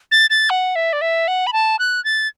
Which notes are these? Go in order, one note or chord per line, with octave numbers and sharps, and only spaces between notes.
A6
A6
F#5
E5
D5
E5
F#5
B5
A5
F#6
A6